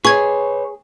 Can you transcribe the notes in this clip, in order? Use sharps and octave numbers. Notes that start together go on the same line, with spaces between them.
G#4 B4 C#5 C#6 G#6